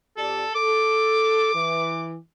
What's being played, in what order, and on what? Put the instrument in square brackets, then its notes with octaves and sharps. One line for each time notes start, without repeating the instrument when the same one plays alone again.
[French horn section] F2 G4 D5 [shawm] A4
[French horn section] A4 [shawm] D6
[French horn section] E3